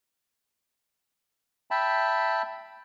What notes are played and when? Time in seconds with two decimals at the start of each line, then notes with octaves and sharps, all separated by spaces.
1.71 E5 G5 A5 B5